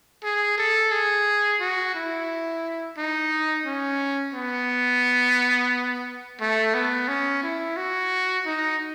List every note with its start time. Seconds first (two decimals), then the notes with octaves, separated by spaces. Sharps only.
0.23 G#4
0.58 A4
0.92 G#4
1.61 F#4
1.95 E4
2.98 D#4
3.66 C#4
4.34 B3
6.41 A3
6.74 B3
7.08 C#4
7.43 E4
7.77 F#4
8.46 D#4